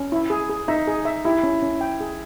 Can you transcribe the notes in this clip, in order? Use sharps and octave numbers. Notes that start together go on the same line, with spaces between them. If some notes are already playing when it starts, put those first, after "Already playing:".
Already playing: C#4
E4
G#4
G#4
D#4 E5
G#4
E5
E4 G4
C#4
C#4
G5
G#4